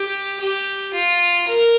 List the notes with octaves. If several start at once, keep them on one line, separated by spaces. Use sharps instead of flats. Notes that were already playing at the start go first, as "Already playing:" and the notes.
Already playing: G4
G4
F4
A#4